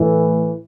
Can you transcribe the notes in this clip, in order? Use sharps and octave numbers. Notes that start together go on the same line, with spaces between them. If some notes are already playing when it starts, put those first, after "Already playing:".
Already playing: A2 E3